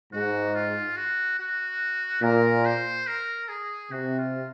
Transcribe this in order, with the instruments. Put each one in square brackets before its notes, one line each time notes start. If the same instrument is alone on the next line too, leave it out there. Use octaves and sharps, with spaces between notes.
[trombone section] G#2 [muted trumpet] F#4
[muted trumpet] F4
F#4
F#4
[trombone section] A#2 [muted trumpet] A#4
[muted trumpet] C5
A#4
G#4
[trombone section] C3 [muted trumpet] F#4
[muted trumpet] F4